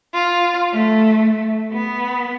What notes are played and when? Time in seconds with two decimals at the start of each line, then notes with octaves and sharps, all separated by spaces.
0.13 F4
0.72 A3
1.73 B3